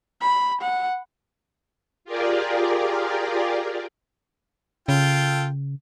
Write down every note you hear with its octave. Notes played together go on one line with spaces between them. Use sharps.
B5
F#5
F4 G4 G#4 A#4 D5
C#3 F4 A4 G5